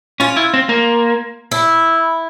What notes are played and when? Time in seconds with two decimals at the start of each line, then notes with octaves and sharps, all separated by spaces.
0.20 C#4 F4
0.37 E4
0.54 C4
0.69 A#3
1.51 E4